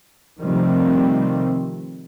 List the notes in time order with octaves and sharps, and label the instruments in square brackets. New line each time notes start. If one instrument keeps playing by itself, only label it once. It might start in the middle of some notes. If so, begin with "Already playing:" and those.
[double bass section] C3 D#3 F3 G3 A3 C4